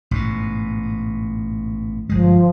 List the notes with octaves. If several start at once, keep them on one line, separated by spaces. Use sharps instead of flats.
A1 G#2 B2
G1 F3 G#3